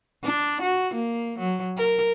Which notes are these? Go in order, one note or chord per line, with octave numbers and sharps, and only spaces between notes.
D4
F#4
A#3
F#3
A#4